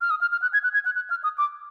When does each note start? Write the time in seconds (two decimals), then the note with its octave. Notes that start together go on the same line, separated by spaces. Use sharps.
0.01 F6
0.10 D#6
0.21 F6
0.32 F6
0.42 F#6
0.53 G#6
0.64 F#6
0.74 G#6
0.85 F#6
0.96 F#6
1.10 F6
1.24 D#6
1.38 D6